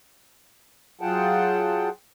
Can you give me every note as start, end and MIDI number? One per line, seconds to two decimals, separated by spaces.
1.01 1.89 54
1.01 1.89 65
1.01 1.89 68
1.01 1.89 78
1.01 1.89 79
1.01 1.89 81